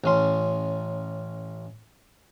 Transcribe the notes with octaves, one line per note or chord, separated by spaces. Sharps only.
A1 C#4 C6